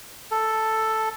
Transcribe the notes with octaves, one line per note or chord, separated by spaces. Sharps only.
A4